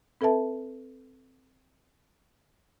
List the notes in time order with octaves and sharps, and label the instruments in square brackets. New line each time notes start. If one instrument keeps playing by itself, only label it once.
[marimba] C4 A4 B4 E5 A5